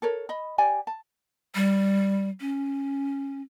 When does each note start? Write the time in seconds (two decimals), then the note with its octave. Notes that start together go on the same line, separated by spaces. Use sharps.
0.02 A4 A#4 C#5
0.29 D#5 B5
0.58 G4 D5 G#5
0.87 A5
1.55 G3
2.40 C#4